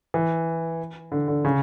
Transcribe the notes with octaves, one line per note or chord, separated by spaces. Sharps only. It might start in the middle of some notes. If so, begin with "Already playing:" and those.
E3
D3
D3
C#3